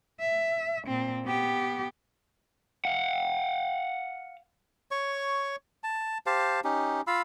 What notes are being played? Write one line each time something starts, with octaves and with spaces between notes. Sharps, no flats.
E5
A#2 C4
B3 G4
F5 F#5
C#5 C#6
A5
G4 C5 F5 A5
C#4 D#4 G4
F4 F5 B5 E6